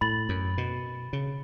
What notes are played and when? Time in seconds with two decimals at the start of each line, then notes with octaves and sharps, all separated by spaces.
0.01 A2 B5 A6 F#7
0.29 F#2
0.58 B2
1.13 C#3